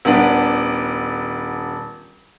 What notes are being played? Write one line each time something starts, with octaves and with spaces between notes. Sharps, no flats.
D#1 B3 D4